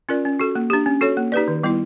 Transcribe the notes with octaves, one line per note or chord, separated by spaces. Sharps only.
C#4 F4 A#4 D5
C#4
F#4 A4
A#3
D4 G4
C#4
F#4 A4 C#5
A#3
D#4 G4 B4 D5
D#3
G3 B3 E4